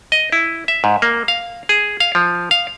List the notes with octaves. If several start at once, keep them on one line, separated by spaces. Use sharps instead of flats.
D#5
E4
E5
G#2
A#3
F5
G#4
F5
F3
F5